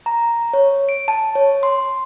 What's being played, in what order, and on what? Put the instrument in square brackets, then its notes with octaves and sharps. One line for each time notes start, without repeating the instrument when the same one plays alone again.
[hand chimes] A#5
C#5
D7
A5
C#5
C6